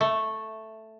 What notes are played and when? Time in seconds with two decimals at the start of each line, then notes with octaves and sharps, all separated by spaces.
0.01 A3